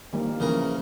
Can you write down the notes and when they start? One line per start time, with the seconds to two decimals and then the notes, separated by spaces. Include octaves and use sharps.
0.13 D#3 G3 A#3
0.40 C#3 E3 F3 A#3 A#4